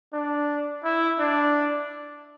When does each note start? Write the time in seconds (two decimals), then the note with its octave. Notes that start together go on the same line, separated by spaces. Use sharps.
0.13 D4
0.84 E4
1.19 D4